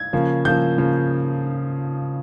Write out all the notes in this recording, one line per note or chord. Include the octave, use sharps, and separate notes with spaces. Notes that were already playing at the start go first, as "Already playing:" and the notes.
Already playing: G#6
C#3 F3 A#3
C#3 F3 A#3 G6
C#3 F3 A#3